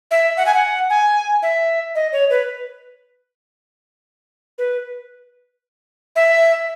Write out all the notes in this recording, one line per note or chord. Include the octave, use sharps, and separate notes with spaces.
E5
F#5
G#5
F#5
G#5
E5
D#5
C#5
B4
B4
E5